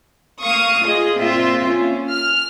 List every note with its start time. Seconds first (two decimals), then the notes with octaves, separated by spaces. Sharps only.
0.41 A#3 F5 C#6 D#6
0.84 F4 G#4 D#5
1.18 A#2 C4 F4 E5
1.72 C#4
2.11 F6